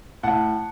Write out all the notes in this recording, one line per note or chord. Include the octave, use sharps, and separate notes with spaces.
A2 F#5 A5